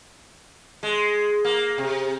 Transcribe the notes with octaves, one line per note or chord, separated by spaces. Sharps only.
G#3
A#3
C3